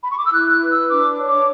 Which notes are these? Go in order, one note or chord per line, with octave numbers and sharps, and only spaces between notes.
B5
C#6
D6
E6
E4 F#6
F#6
B4
E6
D4 D6
C#5
D6